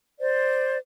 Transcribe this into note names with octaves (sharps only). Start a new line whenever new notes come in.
C5 D5